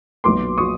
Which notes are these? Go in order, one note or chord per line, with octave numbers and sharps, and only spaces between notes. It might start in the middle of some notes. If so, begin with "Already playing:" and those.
B1 A#2 F#3 B3 C6 D6
A#2 F#3 C#6 D#6